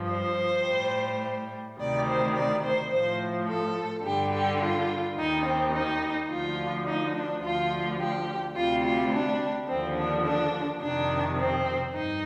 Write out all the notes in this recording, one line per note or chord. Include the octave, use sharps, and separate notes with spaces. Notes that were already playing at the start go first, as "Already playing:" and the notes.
Already playing: G2 F3
C5
A2 G3
D2 C3 D#3 G3 D5
C5
D5
C5
A2 F3 C5
A4
G2 D3 G3 G4
G4
F4
D#2 D#3 G3 D#4
C4
D#4
D2 D3 F3 F4
D#4
D4
D2 D3 F3 F4
G4
D2 C3 G3 F4
F4
D4
D#2 D3 F3 C4
D4
D4
F2 C3 D#3 D4
C4
G2 D#4